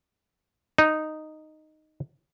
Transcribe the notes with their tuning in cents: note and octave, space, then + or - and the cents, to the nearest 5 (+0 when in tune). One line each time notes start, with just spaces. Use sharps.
D#4 -5